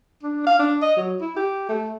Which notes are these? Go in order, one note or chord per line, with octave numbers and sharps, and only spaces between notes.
D4
F5
D4
D#5
F#3
E4
G4
A3